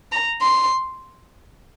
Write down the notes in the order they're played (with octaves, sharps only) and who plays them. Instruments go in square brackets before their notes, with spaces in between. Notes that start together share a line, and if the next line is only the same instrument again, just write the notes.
[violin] A#5
C6